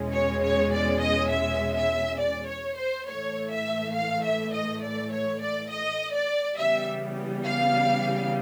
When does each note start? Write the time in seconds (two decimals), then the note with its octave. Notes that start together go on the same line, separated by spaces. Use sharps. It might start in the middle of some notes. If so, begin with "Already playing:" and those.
Already playing: E2 B2 G#3 C#4
0.14 C#5
0.44 C#5
0.73 D5
1.02 D#5
1.31 E5
1.75 E5
2.20 D5
2.49 C#5
2.78 C5
3.07 A2 E3 A3 C#5
3.52 E5
3.95 F5
4.24 E5
4.54 D#5
4.83 D5
5.12 C#5
5.42 D5
5.71 D#5
6.15 D5
6.59 C#3 E3 G3 B3 E5
7.46 F5